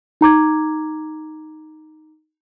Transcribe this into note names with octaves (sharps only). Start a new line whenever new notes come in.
D#4 A#5 D6 G#6